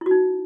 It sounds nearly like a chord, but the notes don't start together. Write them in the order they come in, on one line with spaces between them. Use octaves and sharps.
E4 F#4 D#4